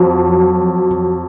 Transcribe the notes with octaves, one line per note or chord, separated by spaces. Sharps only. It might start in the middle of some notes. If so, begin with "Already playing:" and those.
Already playing: F2 F#3